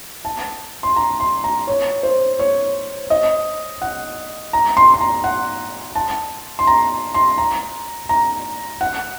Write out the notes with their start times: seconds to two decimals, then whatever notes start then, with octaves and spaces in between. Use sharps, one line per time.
0.25 A5
0.83 C6
0.96 A#5
1.20 C6
1.44 A#5
1.67 C#5
2.03 C5
2.39 C#5
3.10 D#5
3.82 F#5
4.53 A#5
4.77 C6
4.94 C6
5.01 A#5
5.24 F#5
5.95 A5
6.59 C6
6.67 A#5
7.14 C6
7.38 A#5
8.09 A#5
8.81 F#5